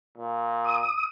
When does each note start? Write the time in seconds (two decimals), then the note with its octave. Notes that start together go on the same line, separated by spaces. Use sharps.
0.18 A#2
0.65 D#6